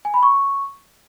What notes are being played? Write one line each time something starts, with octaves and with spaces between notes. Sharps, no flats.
G#5
B5
C#6